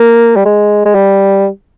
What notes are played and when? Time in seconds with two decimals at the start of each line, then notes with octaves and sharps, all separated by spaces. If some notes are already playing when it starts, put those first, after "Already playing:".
Already playing: A#3
0.36 G3
0.45 G#3
0.85 G#3
0.95 G3